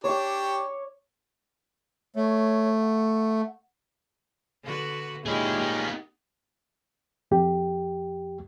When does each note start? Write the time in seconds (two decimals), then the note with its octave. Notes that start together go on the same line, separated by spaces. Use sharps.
0.04 D4 G4 C#5 D6
2.16 A3 C#5
2.82 F#5
4.63 D3 F#4 B4
5.26 A#2 G#3 C#4 D#4 E4 G4 G#4
5.59 A#3 B3
7.31 F2 G4